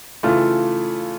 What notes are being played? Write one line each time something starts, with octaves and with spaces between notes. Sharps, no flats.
C#3 E3 A3 F4